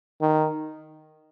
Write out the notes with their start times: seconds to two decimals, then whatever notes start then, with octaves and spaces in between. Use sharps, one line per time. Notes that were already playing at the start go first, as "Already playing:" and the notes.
0.22 D#3